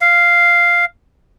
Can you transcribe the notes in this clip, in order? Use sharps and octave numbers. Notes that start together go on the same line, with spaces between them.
F5